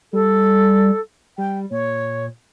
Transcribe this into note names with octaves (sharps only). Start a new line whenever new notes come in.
G3 A4
G3 G5
A#2 C#5